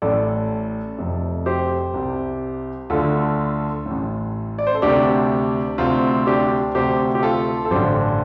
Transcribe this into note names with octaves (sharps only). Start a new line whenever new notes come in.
A1 A2 A4 D5
F1 F2 C3
G4 C5
C2 C3
D2 D3 F4 A4
A1 A2
D5
C5
A4
D2 C3 D4 G4
D2 C3 C4 F4
D4 G4
D2 C3 G4 C5
G4
F4 A4
A4
A1 G2 D3 G4 C5